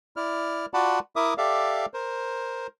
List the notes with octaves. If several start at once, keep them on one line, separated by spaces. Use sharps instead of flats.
E4 D5 F6
F4 F#4 D5 F#5 A5 B5
E4 A#4 E5 D6 D#6
G4 A4 D5 E5 F5
A#4 C5